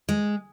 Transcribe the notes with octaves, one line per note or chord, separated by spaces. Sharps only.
G#3